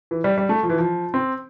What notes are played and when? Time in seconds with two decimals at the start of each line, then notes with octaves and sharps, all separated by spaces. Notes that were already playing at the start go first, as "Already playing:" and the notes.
0.11 E3
0.24 G3
0.38 G3
0.49 A3
0.63 F3
0.69 E3
0.78 F3
1.14 C4